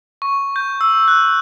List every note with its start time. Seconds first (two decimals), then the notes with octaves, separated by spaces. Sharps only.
0.22 C#6
0.56 G6
0.81 E6
1.08 F#6